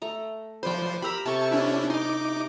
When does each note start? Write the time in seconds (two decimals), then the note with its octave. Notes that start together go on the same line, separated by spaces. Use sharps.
0.02 A3 A#5
0.63 F3 B4 C5 D5 G5
1.02 G4 A#4 A#5 B5 E6
1.26 C3 A4 A5 C#6
1.51 C#4 D4 E4
1.90 D#4 C6 D6